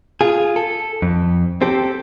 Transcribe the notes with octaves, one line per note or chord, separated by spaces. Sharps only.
F4 G#4
A4
F2
C4 G4 A4